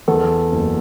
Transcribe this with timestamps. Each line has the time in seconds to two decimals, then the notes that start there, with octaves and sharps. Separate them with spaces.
0.08 E2 A4
0.52 F#1